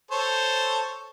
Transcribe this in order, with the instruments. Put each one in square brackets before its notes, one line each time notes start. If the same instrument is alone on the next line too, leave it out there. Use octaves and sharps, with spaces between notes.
[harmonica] A4 C5 C#5